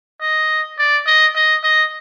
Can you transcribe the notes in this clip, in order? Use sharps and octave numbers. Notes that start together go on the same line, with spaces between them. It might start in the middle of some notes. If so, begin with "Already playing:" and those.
D#5
D5
D#5
D#5
D#5